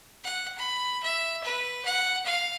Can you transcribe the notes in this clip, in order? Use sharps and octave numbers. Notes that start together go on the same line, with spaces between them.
F#5
B5
E5
B4
F#5
F5